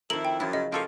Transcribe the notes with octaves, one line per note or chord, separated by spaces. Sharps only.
F2 D#3 E4 A#4 F#7
G5
F#2 F3 E4
C#3 D#5
F#2 F3 A#3 G4 A4 C#5